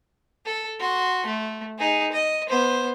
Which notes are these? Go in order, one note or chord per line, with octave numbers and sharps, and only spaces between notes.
A4
F#4 C6
A3
D#4 G#4
D#5
B3 C5